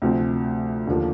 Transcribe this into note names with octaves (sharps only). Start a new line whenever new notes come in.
D2 C3 F3 C4
D#2 D3 F3 A#3